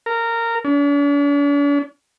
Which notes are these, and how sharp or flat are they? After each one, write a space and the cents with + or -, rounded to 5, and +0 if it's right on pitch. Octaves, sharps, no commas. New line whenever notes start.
A#4 -15
D4 -45